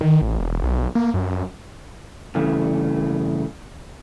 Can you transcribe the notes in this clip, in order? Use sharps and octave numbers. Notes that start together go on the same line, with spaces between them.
D#3
A1
E1
B1
A#3
F#2
G2 C#3 E3 A3